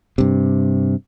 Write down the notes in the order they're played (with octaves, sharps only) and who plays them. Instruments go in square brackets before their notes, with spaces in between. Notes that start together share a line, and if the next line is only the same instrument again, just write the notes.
[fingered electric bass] G2 C3